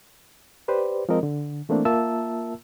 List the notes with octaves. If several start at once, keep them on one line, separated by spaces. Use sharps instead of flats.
G4 B4 C5 D5
F3 G#3 C4 A#4 D#5
D3
E3 A3 A#3 C4 D4
A#3 F4 A#4 E5 A5 E6